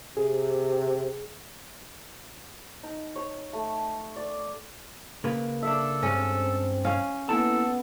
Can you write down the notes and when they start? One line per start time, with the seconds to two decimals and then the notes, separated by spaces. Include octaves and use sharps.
0.17 C3 G#4
2.83 D#4
3.16 C#5
3.53 A3
4.16 D5
5.24 C#3 A#3 B4
5.62 D4 A4 E5
6.03 G2 G#3 C4 C#4
6.85 C#4 F5
7.29 A#3 B3 E4 A4 A5